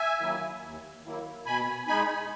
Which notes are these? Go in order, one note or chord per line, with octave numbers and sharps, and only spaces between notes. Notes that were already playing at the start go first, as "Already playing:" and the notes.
Already playing: E5 G#5
D#3 F#3 A#3 E4
D#2
D#3 F#3 A#3 E4
B2 G#5 B5
G#3 D#4 G#5 B5